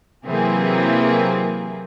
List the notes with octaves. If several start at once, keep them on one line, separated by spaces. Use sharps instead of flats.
C3 E3 F#3 A#3 C4 G#4